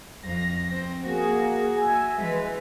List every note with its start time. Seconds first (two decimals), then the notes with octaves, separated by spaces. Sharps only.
0.23 F2 F5 A#6
0.69 C4
1.06 A#3 F#4 G#4
1.77 E5 G#5
2.18 E3 G#3 B4